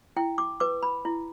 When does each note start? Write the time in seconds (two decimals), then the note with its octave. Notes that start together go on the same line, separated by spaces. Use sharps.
0.16 E4 G5
0.38 D6
0.60 B4 D6
0.83 B5
1.05 E4